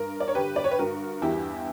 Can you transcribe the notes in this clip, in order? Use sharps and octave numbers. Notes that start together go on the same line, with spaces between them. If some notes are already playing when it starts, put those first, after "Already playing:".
Already playing: G2 A#4
D5
C#5
D3 G4 B4
D5
C#5
B4
G2 F#4 A#4
E2 E4 G4